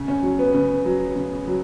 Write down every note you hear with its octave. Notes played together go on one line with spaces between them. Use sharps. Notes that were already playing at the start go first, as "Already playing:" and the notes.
Already playing: C#3
C#4
F#3
B3
C#3
F#3
C#3
F#3